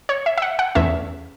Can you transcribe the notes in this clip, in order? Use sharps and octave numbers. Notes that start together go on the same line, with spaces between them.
C#5
E5
E5
F#5
F#5
E2 E3 A3 C#4 E5